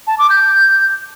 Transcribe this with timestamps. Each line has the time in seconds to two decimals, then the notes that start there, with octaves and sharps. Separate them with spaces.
0.07 A5
0.19 D6
0.30 G6